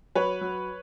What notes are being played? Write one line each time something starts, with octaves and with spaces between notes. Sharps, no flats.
F#3 B4 C#5
F#3